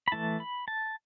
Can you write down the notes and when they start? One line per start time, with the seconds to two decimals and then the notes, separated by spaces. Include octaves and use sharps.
0.08 B5
0.12 E3 A3 E4 A5
0.40 B5
0.68 A5